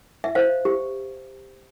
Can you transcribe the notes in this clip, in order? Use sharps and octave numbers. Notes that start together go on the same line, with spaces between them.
E5
C5 F5
G4